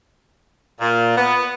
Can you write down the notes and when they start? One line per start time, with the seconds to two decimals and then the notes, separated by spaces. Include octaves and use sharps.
0.80 A#2
1.16 B3